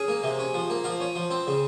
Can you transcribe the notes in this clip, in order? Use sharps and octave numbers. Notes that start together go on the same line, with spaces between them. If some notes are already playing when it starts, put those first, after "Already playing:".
Already playing: C#4 G#4
A#3
C3
C#4
F3
A#3
F3 F5
C#4
F3
C4
C#3